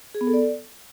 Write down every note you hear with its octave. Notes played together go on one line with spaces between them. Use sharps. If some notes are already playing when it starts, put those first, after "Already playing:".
G#4
B3
A4
D5